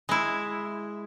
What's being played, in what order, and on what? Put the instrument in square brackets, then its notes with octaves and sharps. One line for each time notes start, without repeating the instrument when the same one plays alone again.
[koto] G#3 E4